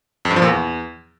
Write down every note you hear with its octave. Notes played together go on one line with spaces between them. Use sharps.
F2
G2
F3
A#2
E2